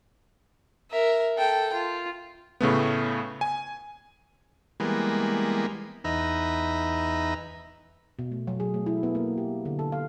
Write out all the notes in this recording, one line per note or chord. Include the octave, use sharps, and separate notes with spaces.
A#4 E5
A4 G5
F4
A2 C#3 A3 B3
G#5
E3 G3 G#3 A#3 B3
E2 D#4 B4 E5 A#5
B2
A3
F#3
G#4
A3
E4
B3
A#3
G4
D3
A4
F5